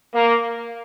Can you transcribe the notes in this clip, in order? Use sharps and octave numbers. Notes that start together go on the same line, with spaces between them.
A#3